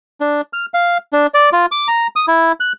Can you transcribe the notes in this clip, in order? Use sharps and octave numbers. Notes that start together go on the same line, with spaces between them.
D4
F6
F5
D4
D5
F4
D6
A#5
D#6
E4
F#6